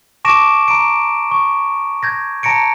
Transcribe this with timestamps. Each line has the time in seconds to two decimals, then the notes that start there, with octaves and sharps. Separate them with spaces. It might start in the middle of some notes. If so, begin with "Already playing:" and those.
0.25 A5 C#6 D6 A#6 D7 E7
0.68 A#5 D7
1.31 C#6
2.03 G6 G#6 A#6
2.43 A5 A#5 A#6 C#7 D7